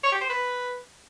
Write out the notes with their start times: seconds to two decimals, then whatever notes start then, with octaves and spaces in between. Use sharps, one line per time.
0.03 C#5
0.12 G4
0.21 C5
0.30 B4